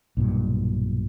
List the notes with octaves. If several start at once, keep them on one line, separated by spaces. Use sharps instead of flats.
B1 G2 A#2